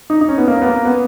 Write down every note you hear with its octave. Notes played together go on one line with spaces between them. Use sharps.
D#4
D#4
C#4
B3
A#3
B3
A#3
B3